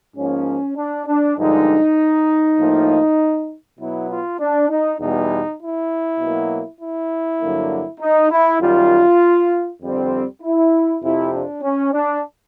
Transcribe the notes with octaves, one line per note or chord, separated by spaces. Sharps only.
G#2 F3 A#3 C#4
D4
D4
G2 D3 F3 G#3 D#4
A2 F3 A#3
B2 F#3 B3 E4
F4
D4
D#4
E2 B2 G3 D#4
E4
B2 F#3 A#3
E4
G2 D3 F#3 A#3
D#4
E4
F#2 D#3 G3 F4
F2 D3 G3 C4
E4
F2 C3 F3 E4
D4
C#4
D4